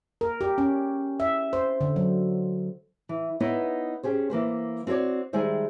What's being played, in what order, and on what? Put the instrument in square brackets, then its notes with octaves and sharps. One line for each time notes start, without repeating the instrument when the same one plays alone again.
[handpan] A#4
G4
C#4
E5
C5
D3
F#3
[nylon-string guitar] E3
B3 D#4 E4 B4 C#5
C#4 G4 G#4 C5
E3 A#3 B4 C5
C4 F#4 A#4 C#5 D5
D#3 G3 G#3 G#4 C5 E5